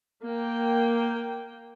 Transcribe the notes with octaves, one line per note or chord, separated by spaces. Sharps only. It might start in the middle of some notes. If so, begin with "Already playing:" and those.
A#3 G5